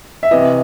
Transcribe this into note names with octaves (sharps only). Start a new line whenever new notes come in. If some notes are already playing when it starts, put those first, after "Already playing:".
E5
C3 E3 D#5